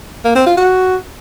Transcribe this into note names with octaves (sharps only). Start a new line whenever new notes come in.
A#3
C4
F4
F#4